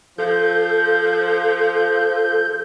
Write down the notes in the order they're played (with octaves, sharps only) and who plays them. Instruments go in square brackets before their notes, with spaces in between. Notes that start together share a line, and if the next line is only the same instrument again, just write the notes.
[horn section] F3 [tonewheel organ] A4 G6